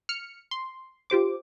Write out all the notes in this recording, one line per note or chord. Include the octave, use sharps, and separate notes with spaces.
F6 C#7
C6
F4 G4 C5 D6